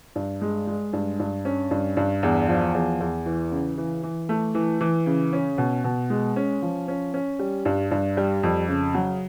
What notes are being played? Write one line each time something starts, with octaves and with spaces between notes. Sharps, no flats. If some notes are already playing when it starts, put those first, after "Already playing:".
G2
G#3
G#3
G2
G2
C#4
G2
G2
E2
F3
E2
E2
E3
C#3
E3
E3
A3
E3
E3
C#3
C#4
B2
B2
G#3
C#4
F3
C#4
C#4
G3
G2
G2
G3
F2
C#3
F#3